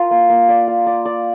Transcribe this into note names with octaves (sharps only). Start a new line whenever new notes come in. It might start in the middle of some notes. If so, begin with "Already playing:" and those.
Already playing: F4 A#4
A#3
A#3
D5
F5
D5
D5